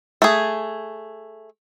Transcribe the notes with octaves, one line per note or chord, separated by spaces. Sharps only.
A3 G#4